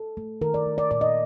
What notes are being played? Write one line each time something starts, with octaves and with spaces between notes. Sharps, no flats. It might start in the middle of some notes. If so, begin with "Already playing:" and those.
Already playing: A4
A3
D#3 A#4
D5
A3
D5
A#2 D5
D#5